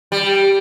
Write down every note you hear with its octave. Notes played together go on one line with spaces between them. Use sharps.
G3